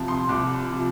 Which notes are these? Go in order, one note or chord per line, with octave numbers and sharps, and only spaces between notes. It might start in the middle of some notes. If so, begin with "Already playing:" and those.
Already playing: C2 C3 F3 A5
C6
C2 D6
C3 F3